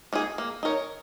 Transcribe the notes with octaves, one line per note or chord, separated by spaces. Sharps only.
A#3 D#4 G#4
A#3
D#4 A#4 C#5